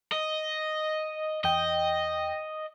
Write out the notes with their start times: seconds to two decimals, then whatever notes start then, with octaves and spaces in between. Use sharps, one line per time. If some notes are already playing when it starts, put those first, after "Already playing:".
0.12 D#5
1.44 E2 D#5 G5